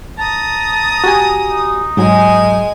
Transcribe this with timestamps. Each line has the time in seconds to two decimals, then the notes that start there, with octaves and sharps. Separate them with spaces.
0.19 A5 A#5 D#6
1.04 F#4 G4 G#5
1.48 D#4
1.97 G#2 F#3 G#3 G#5